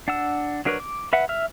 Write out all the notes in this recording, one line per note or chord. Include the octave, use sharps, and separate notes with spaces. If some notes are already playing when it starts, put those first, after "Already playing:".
D4 F#5 E6
F#3 D4 A#4 B4 C#5
D6
B4 E5 F#5
E5 E6 F6